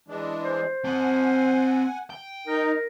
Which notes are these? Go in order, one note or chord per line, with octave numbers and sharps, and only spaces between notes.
E3 G#3 D4
C5
C4 F#5 G#5 A5
G5
D#4 A#4